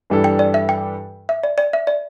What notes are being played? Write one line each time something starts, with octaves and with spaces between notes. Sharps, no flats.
G2 E3 G3 D4 A4
G5
D5
E5
G5
E5
D5
D5
E5
D5